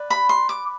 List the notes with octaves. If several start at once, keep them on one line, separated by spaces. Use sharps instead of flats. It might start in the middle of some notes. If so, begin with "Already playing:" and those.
Already playing: B4 D5
B5
C6
D6